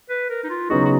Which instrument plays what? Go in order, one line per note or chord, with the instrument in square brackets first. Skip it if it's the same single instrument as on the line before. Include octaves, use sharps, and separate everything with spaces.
[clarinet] B4
A#4
D#4
F4
[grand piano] C#3 F#3 B3 D#4 G#4 [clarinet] F#4
[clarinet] F#4